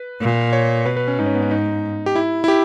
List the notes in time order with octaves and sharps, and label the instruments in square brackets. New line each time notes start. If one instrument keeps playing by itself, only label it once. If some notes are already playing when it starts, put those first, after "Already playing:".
Already playing: [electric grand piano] B4
[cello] A#2
[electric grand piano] C#5
[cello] B2 [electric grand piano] B4
[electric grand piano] B4
C#4
[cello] G#2 [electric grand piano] D#4
[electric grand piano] C#4
B3
C#4
D#4
G4
E4
E4
G4